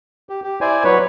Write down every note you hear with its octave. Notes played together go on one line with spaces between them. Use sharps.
G4
G4
E4 C5 D5 G#5
F#3 B4 C#5